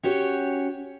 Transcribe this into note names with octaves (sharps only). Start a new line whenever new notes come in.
C#4 F#4 G4 C#5